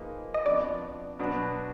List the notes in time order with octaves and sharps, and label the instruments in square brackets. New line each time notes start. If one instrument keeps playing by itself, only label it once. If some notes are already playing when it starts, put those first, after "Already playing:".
Already playing: [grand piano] F3 A#3 D#4 G#4 B4
[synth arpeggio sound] D#5
[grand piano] F2 F3 B3 D4 F#4 [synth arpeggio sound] D5
[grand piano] B2 F#3 B3 D4 F#4